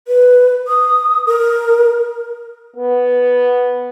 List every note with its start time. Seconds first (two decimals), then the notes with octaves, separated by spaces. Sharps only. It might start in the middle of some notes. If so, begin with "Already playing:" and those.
0.08 B4
0.67 D#6
1.27 A#4
2.77 B3